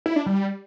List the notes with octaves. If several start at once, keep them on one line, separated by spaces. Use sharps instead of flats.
E4
D4
G3